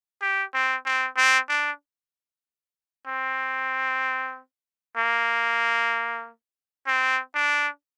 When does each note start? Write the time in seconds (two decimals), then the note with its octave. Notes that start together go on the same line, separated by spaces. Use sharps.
0.22 G4
0.54 C4
0.86 C4
1.17 C4
1.49 D4
3.07 C4
4.97 A#3
6.87 C4
7.35 D4